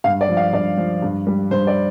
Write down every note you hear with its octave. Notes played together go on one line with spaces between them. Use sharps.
G2 F5
D5
F3
F5
G2 D5
F3
G2
G3
G2 C5
D5